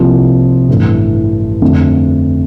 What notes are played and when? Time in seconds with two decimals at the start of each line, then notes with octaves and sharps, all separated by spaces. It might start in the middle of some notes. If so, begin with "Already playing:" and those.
Already playing: C2 C3 F3 A#3 E4
0.69 A1 G2 E3 A3
1.61 F2 D3 F3 A3 C4